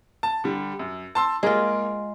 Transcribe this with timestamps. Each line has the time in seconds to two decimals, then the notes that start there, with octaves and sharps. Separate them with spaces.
0.23 A5
0.44 D3 G3
0.79 F#2
1.15 A5 C6 E6
1.43 G#3 A#3 F4 A#4